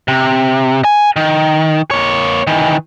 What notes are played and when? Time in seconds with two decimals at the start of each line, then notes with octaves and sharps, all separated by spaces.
0.08 C3
0.84 G#5
1.16 D#3
1.91 A#3 C#5
2.47 D#3 E3